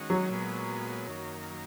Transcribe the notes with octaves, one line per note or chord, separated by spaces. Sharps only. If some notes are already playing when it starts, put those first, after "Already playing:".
Already playing: D#3 G#3 C#4 F#4
F#3
A#2 G#3 B3
F#2 D#3 A#3